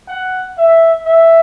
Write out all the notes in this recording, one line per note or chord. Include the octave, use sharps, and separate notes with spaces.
F#5
E5
E5